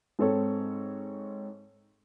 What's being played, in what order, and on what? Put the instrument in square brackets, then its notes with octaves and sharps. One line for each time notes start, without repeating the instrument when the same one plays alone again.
[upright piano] G#2 C4 A4 C#5